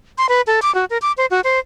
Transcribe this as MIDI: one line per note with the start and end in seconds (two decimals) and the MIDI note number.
0.18 0.27 84
0.29 0.41 71
0.47 0.60 69
0.62 0.73 86
0.75 0.85 66
0.90 0.98 70
1.02 1.12 86
1.18 1.26 72
1.31 1.41 66
1.44 1.59 72